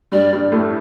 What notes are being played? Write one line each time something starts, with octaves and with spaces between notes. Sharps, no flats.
G2 G3 D5
G2 G3
A2 A3